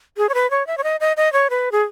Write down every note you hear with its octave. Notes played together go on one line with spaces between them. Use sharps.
G#4
C#5
B4
C#5
E5
C#5
D#5
D#5
D#5
C#5
B4
G#4